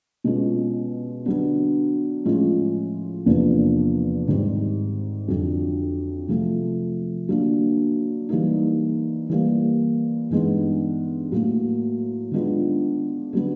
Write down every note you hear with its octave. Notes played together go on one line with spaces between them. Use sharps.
B2 G#3 C#4 F4
D3 F#3 B3 D4
A2 F3 G#3 C#4 F4
E2 C3 F3 A#3 D4
G#2 D#3 G3 C4
F2 D3 F#3
C3 F3 A3
D3 F#3 A#3 D4
E3 G3 A#3 D#4
E3 G3 A#3
G2 E3 G#3 B3 D#4
A2 F#3 A#3
D#3 G#3 B3 D4 F4
D3 F#3 B3